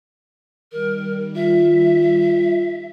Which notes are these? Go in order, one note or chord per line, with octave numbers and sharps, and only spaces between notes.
D#3 G3 A#4
F4 E5